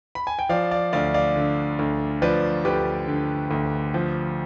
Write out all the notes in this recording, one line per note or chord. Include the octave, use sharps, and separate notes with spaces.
B5
G#5
G5
F3 D5 F5
D5 F5
D2 D5 F5
D5 F5
D3
D2
F3 B4 D5
D2 G4 B4
D3
D2
F3